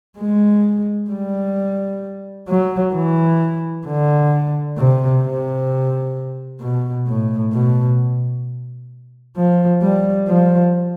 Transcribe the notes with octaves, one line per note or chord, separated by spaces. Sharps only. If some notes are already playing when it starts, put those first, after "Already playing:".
G#3
G3
F#3
E3
D3
C3
C3
B2
A2
B2
F3
G3
F3